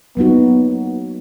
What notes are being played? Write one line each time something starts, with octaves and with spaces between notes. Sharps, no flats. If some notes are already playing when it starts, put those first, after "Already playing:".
F#3 A#3 B3 D#4 F#4